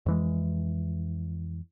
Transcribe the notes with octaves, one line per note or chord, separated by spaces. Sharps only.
F2 E3 G#3